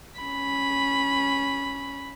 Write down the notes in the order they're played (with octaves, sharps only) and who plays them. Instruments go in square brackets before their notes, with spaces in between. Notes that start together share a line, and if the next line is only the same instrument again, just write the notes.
[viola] C#4 B5